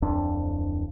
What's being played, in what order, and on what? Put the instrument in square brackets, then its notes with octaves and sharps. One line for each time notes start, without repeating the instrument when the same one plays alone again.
[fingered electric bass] D1 F2 D4